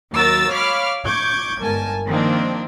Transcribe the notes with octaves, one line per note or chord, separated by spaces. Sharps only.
D#2 F#3 A#4 E6 A6
C#5 F5 B5 D6 F6
C#6 D6 G6 G#6
G1 G#2 A#4 G#5 A5
D#3 F3 A#3 C4 D4